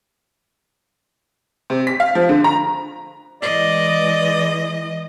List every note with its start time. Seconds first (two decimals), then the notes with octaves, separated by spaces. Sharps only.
1.70 C3
1.87 B6
2.00 F5
2.15 F3
2.29 D3
2.44 A#5
3.42 E3 G#3 D5 D#5